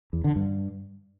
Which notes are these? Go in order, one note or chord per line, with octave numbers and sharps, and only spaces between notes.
E2
D3
G2